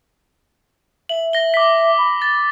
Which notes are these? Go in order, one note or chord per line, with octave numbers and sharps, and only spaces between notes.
E5 F#7
A#6 G7
D6 B6
B5
A6